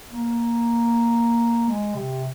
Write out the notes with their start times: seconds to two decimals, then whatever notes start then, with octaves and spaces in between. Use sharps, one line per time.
0.11 A#3
1.69 G#3
1.95 C3